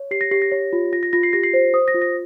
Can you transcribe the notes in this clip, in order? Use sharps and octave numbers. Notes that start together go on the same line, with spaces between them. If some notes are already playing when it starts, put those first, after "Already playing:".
Already playing: C#5
G4 C7
A#6
G4 C7
A#6
C#5
F4
F4 A#6
A#6
F4 A#6
C7
G4 A#6
C7
C5
C5 D#6
A#6
F4
A#6